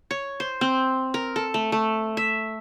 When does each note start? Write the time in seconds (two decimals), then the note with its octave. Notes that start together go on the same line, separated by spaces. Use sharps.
0.11 C#5
0.40 C5
0.61 C4
1.14 A#4
1.36 A4
1.54 A3
1.72 A3
2.17 E5